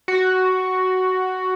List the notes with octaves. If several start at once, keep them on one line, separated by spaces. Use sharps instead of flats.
F#4